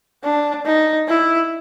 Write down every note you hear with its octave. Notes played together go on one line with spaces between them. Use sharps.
D4
D#4
E4